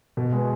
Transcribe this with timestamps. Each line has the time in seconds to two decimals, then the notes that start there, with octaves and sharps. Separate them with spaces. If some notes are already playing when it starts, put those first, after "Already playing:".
0.17 B2
0.33 G#3 B3